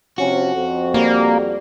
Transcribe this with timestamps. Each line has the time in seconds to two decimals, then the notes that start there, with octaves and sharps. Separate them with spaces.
0.18 C3 F3 C#4 F#4
0.55 F2
0.94 G3 A#3